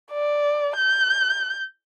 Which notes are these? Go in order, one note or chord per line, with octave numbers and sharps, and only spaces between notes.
D5
G6